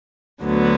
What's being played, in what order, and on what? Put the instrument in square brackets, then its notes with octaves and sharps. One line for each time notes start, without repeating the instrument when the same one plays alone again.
[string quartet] D2 D3 F#3 B3